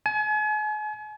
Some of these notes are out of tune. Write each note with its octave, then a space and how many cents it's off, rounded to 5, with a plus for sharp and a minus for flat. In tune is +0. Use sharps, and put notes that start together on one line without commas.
G#5 +40